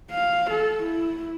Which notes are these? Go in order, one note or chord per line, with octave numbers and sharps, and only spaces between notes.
F5
A4
E4